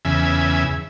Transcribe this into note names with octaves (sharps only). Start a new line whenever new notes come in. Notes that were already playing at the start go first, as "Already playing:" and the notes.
E2 C#3 E5 G#5